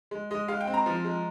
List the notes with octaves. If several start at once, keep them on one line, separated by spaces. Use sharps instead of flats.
G#3
G#3 D#5
G#3 F5
G5
C4
A#5
F3
G#3